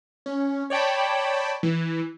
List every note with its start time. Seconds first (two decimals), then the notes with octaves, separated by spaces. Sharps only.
0.26 C#4
0.70 C#5 D5 G5 A5 B5
1.63 E3